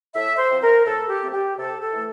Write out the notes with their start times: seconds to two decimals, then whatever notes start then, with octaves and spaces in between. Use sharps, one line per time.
0.15 A2 E5
0.38 C5
0.50 F3 C4
0.62 A#4
0.86 A2 A4
1.09 G4
1.22 F3 A3 C4
1.33 G4
1.57 C3 A4
1.82 A4
1.93 E3 A3